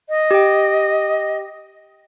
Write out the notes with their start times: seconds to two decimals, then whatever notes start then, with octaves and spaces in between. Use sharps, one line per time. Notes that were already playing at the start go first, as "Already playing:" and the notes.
0.09 D#5
0.31 G4 G5